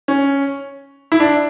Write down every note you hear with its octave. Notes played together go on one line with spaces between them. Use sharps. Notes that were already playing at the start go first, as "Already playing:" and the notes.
C#4
E4
D4